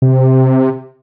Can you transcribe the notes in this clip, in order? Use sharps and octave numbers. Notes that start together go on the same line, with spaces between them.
C3